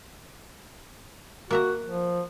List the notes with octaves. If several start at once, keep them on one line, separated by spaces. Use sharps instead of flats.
A#3 F#4 E5 A#5
F3